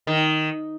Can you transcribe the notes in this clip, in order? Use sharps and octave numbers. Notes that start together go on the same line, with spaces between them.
D#3